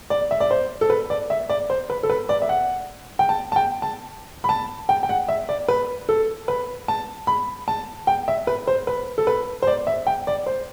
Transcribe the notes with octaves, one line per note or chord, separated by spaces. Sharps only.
D5
E5
D5
C5
A4
B4
D5
E5
D5
C5
B4
A4
B4
D5
E5
F#5
G5
A5
A5
G5
A5
B5
A5
G5
G5
F#5
E5
D5
B4
A4
B4
A5
B5
A5
G5
E5
B4
C5
B4
A4
B4
C5
D5
E5
G5
D5
C5